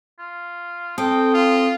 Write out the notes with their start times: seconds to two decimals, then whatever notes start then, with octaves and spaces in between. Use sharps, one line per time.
0.19 F4
0.98 C4 A4 G5 D#6
1.34 F4